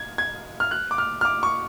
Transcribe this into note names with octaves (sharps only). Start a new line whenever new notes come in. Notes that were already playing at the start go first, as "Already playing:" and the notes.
Already playing: G#6
G#6
F6
F#6
D6
F6
F6
D6
C#6